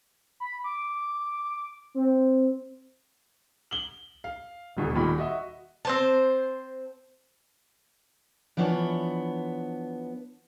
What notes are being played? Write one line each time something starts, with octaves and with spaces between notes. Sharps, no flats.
B5
D6
C4
F#7 G7
F5
D#1 D2 B2 A3
D#1 A#2 D#3 B5
F#4 D#5 E5
C4 C5 A5
E3 F3 B3 D4 C#5